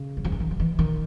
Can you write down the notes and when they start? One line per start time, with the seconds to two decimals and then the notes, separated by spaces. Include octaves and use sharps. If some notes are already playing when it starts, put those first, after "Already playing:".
Already playing: C#3
0.17 F#3
0.25 F3
0.32 E3
0.40 D#3
0.51 F3
0.60 E3
0.79 D#3